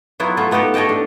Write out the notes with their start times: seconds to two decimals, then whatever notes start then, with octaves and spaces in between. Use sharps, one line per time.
0.20 F#3 B3 E4 F4
0.37 A3 B3 E4 F4
0.51 A3 B3 D#4 G4 A4
0.74 A4 C#5 D#5 G5 A5
0.89 A2 D4